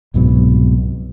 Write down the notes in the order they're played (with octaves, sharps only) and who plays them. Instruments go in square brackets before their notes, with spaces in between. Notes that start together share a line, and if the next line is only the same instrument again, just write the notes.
[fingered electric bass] C2 G#2 B2 F#3